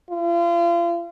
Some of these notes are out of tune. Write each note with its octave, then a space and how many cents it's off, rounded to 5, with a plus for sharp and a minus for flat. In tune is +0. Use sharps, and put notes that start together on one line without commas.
F4 -35